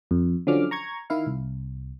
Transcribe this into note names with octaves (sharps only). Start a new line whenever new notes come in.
F2
D3 F3 F#3 C#4 D6 F6
A#5 C#6 G#6
D#3 E4 F5
C2